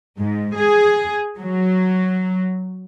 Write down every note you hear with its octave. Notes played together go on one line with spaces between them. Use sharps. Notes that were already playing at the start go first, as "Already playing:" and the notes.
G#2
G#4
F#3